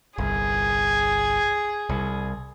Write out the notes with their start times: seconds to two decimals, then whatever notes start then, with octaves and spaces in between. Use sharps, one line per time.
0.18 G1 C2 G#4
1.89 C2